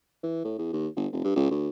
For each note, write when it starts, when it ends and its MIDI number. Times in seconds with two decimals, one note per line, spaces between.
0.23 0.44 52
0.45 0.55 45
0.58 0.69 40
0.73 0.87 39
0.96 1.07 31
1.12 1.22 29
1.24 1.32 43
1.36 1.50 37
1.51 1.69 38